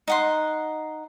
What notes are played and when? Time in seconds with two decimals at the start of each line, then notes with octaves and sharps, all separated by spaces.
0.08 D#4 F#5 C6